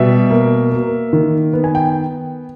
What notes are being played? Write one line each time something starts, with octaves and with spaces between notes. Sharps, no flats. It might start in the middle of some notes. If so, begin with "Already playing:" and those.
Already playing: B2 G3 E5
A#3
A#3
D#3
B3
G#5
G5